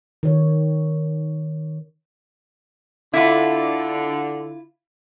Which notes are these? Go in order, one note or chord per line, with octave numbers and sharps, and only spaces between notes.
D#3 C#5
D3 E4 F4